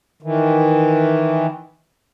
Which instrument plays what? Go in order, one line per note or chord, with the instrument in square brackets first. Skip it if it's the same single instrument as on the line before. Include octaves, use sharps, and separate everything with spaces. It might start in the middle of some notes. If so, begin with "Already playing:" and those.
[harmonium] D#3 E3